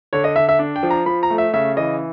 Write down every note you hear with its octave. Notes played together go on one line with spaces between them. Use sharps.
D3 C#5
D#5
D3 E5
E5
D4
G5
F3
A#5
F3 B5
A#5
A3
E5
C#3 E5
E3 D#5